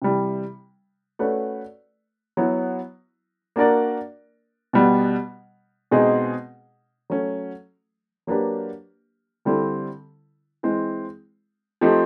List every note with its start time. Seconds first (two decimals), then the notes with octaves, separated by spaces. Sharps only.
0.02 C3 E3 G3
1.19 A3 C#4 F#4 B4 D5
2.37 F#3 B3 E4
3.56 A#3 D4 F#4 A#4 D5
4.73 B2 G3 B3
5.91 B2 G#3 C4 D#4 G#4
7.10 F#3 A3 C#4
8.27 F#3 A#3 D4 G4 B4
9.45 D3 G3 C4 E4 A4
10.63 E3 G#3 C4
11.81 F3 A3 C4 D#4 G4